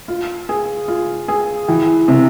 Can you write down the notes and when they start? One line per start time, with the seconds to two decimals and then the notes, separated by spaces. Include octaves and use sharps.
0.08 F4
0.49 G#4
0.88 F4
1.28 G#4
1.68 E3
2.08 C3